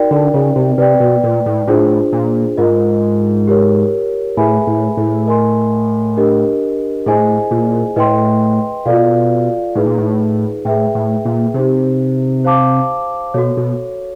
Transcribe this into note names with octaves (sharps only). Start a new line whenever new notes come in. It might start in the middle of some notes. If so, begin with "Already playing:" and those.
Already playing: D#4 F#4 A#4 D5 G5
D3
C#3
C3
C3 B4 D5 G5
B2
A#2
A2
A2 D4 F4 G#4 C5
A#2
G#2 F4 A#4 D#5
G4 A#4 C#5
A2 G#4 B4 E5 G#5 B5
A2
A2
A#4 D#5 G#5 C6
D4 G4 A#4 D#5
A2 E4 G#4 C5 D#5 G#5
A#2
A2 B4 D#5 G5 C6
B2 F4 A4 D5 F5
A2 D#4 G#4 B4
A#2
A2
A2 G#4 B4 E5 G5
A2
A#2
C3 D#4 G4 C5
C5 F5 A5 D6
B2 F#4 A4 C#5
B2